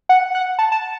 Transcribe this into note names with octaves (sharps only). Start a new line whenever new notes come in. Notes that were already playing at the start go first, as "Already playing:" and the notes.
F#5
F#5
A5
A5